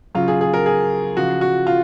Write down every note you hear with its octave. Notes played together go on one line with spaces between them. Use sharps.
C#3 F#3 F4
G#4
G#4
A#4
G#4
C#3 F3 F#4
F#4
F4